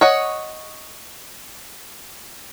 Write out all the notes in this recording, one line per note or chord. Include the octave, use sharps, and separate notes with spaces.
C#5 D#5 F#5